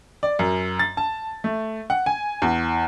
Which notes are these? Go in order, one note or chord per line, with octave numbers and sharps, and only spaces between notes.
D5
F#2
A6
A5
A3
F#5
G#5
E2